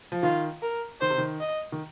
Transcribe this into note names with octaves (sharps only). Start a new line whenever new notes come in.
F3
D#3 F4
A#4
D#3 C5
C3
D#3
D#5
D#3